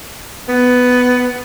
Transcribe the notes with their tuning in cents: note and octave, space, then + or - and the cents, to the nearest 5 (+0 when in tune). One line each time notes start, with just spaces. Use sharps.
B3 +10